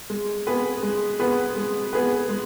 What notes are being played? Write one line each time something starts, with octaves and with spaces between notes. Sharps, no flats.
G#3
B3 G#4 B4
G#3
B3 G#4 B4
G#3
B3 G#4 B4
G#3